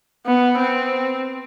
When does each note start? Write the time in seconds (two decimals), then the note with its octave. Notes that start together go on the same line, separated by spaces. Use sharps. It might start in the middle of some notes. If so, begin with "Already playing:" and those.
0.26 B3
0.58 C4